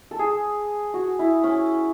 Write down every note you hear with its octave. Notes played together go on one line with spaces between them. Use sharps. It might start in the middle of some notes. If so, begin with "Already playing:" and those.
A4
G#4
F#4
E4
C#4